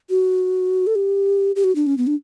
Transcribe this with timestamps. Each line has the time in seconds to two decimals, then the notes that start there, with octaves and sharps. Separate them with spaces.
0.10 F#4
0.87 A4
0.95 G4
1.56 G4
1.64 F#4
1.76 D4
1.87 C#4
1.98 B3
2.07 D4